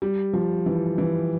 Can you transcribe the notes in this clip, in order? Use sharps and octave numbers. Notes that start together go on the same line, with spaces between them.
G3
F3
E3
E3